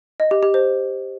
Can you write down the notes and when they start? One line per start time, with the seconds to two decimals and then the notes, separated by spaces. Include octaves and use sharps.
0.20 D#5
0.31 G4
0.43 G4
0.54 C5